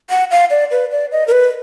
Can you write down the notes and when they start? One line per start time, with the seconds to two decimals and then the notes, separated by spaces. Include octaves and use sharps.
0.10 F#5
0.31 F5
0.50 D5
0.71 B4
0.92 D5
1.12 D#5
1.28 A#4
1.32 B4